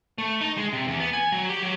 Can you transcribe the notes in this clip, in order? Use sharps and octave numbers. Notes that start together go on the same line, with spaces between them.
A3
D#4
G#3
C3
E2
B3
G#5
F#3
G4
F#3